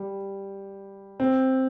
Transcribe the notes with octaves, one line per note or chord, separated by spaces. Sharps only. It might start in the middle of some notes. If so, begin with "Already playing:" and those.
Already playing: G3
C4